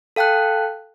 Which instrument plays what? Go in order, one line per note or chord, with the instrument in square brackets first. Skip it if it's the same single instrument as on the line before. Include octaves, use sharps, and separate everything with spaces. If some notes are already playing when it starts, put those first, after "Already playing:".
[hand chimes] A4 F5 G5 A5 F#6